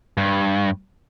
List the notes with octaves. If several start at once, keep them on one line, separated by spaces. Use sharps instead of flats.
G2